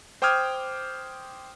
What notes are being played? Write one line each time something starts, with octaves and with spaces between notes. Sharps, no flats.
C5 G5 D6 D#6 F6 G#6